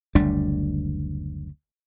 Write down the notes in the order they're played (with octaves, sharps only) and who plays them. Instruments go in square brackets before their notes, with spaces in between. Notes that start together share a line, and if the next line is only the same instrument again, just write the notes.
[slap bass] F#1 D2 G3 D4